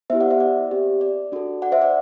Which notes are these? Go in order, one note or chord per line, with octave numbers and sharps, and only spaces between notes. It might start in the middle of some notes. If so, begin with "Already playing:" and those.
B3 E4 G4 C5 E5
D5 F#5
C5 E5
D5
C4 G4
D5
D4 F#4 A4
D5 F#5
C5 E5
D5